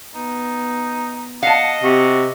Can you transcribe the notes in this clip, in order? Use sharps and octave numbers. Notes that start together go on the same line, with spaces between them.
B3 D#4
D#5 F5 F#5 A5
C3 F#4